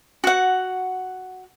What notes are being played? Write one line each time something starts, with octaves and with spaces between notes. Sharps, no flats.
F#4 F#5